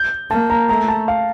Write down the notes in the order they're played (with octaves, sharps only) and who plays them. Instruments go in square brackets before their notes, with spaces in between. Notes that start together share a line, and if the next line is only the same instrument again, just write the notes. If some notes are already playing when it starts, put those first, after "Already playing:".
Already playing: [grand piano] G6
[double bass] A#3 [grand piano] A5
[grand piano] A#5
[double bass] A3 [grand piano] A#5
[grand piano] A5
F5